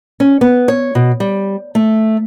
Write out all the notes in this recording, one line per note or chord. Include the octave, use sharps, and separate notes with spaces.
C#4
B3
C#5
B2
G3
A3